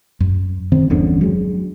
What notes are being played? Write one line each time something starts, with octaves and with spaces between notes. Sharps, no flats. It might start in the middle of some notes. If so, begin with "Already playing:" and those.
F#2
D#3 C4
G1 E2 D3 C#4
F#3 G#3